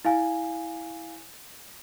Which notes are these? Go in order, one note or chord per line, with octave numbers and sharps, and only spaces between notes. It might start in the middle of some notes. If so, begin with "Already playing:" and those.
E4 F5 G#5